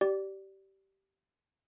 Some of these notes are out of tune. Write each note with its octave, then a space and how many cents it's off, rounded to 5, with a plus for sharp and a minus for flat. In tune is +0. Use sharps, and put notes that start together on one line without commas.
G4 -20 D5 +0